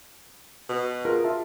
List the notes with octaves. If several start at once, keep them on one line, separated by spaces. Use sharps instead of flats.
B2
F4 G#4 A#4
F4 E5 A5